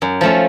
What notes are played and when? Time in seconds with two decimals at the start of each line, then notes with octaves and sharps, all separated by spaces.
0.02 F#2
0.21 F3 A3 C#4